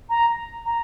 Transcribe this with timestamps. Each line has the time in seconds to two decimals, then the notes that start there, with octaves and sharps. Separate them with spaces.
0.09 A#5
0.65 A#5